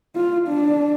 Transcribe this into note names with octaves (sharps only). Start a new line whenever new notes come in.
F4
D4